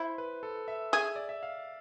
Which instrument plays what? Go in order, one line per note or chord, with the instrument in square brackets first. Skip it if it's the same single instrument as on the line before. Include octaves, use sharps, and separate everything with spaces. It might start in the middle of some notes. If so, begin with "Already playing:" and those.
Already playing: [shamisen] E4 [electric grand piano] C5
[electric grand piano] B4
A4
E5
[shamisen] G#4 [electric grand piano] E5
[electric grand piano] D5
E5
F5